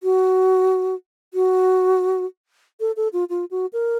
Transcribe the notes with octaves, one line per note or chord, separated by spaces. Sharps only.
F#4
F#4
A4
A4
F4
F4
F#4
A#4